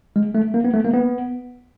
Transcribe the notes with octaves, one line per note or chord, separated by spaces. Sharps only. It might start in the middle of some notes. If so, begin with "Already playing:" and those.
G#3
A3
A#3
B3
A3
A#3
B3